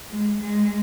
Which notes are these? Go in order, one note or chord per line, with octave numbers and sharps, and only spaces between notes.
G#3
G#3